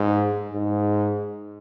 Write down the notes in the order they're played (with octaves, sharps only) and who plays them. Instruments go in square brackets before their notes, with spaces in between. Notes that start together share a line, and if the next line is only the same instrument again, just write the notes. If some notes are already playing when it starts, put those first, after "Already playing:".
Already playing: [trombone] G#2
G#2